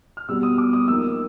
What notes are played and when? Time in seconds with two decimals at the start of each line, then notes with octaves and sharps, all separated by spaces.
0.17 F6
0.28 B2 G3 B3 E6
0.43 D#6
0.58 D6
0.73 D#6
0.88 F3 A#3 D#4 E6